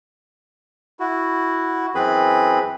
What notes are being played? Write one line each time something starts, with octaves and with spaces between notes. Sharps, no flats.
E4 F#4
F#2 E3 C4 G#4 B4 B5